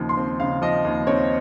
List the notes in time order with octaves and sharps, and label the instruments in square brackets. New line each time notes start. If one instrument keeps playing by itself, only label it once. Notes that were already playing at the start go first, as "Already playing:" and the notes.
Already playing: [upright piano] D#2 C#3 F3
C6
C4
C#3 F5
F3 D#5
D#2
C4 C#5